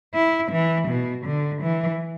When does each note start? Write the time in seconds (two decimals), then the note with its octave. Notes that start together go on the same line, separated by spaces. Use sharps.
0.15 E4
0.52 E3
0.88 B2
1.26 D3
1.62 E3